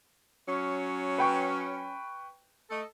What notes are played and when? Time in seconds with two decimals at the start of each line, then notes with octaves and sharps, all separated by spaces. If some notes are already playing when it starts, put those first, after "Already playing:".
0.47 F#3 C#4
1.18 B4 G5 C#6
2.70 A3 A4 D#5